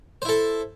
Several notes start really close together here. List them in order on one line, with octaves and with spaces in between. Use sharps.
C5 E4 A4